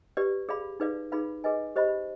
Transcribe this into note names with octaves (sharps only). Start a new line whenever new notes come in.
G4 B4 D5
G#4 D5 F5 B5
D#4 G#4 B4 D5 F5
D#4 G#4 B4 F5 B5
G#4 B4 D#5 G#5
G4 C5 D#5 B5